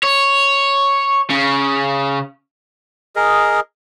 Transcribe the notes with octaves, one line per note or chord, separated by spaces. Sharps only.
C#5
C#3
G#4 A#4 D#5